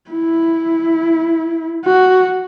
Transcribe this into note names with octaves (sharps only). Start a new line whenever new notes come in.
E4
F#4